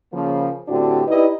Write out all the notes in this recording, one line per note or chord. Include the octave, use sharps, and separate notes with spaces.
C#3 F3 A#3
A2 D3 C4 D4 F#4 G4
D#4 E4 G4 B4 D5 D#5